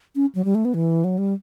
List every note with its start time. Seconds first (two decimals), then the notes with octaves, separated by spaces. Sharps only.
0.15 C#4
0.35 F#3
0.45 G3
0.55 A3
0.65 B3
0.74 E3
1.04 F#3
1.18 G3